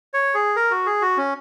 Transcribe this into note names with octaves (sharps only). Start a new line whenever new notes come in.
C#5
G#4
A#4
F#4
G#4
F#4
C#4